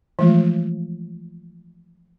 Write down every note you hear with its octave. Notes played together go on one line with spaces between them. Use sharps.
E3 F3 G#3 A3 F4